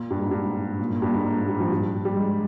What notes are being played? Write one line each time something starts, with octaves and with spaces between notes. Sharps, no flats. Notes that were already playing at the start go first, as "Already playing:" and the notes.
Already playing: A#2
G2
G#2
G2
A#2
A#2
G2
A#2
G#2
G#2
G3
F3
G3
G3
G#3